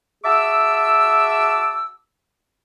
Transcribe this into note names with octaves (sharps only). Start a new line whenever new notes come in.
F#4 G#4 E5 A5 D6 E6